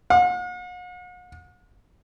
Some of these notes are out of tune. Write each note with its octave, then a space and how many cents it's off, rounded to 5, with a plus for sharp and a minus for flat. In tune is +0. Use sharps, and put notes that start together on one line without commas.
F#5 -45